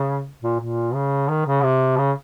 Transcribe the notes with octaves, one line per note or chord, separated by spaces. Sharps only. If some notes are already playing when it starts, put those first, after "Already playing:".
Already playing: C#3
A#2
A#2
C#3
D#3
C#3
C3
C#3